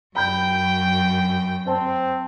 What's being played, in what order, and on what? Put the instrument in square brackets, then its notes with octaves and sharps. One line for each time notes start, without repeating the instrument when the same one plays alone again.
[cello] F#2 [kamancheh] G5 [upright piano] B5 G6
[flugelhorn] C4 [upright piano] C5 A5